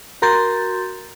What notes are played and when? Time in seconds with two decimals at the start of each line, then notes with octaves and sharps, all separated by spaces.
0.22 F#4 A#4 A#5 C6 G6 A6